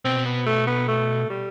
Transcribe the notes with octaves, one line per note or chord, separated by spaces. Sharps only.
B2 C4
B3
A3
B3
A3
G3